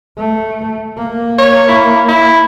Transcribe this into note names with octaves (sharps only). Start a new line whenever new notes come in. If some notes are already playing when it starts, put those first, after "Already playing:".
A3
A#3
C#5
E4
E4